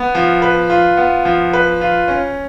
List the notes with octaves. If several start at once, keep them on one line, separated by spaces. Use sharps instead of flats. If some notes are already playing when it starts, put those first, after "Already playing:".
Already playing: B3
F3
B4
F4
B3
F3
B4
F4
C#4